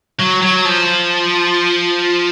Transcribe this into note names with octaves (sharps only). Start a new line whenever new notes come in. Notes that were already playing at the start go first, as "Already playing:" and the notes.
F#3
F#3
F3